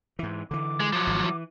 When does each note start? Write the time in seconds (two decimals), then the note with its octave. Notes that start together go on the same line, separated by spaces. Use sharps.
0.19 G#2 E3
0.51 D3 E3 D6
0.80 G#3
0.93 F3 F#3
1.07 G#1
1.24 E3